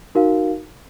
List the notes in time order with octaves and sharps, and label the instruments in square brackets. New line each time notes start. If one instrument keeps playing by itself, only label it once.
[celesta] D#4 F#4 A#4 F5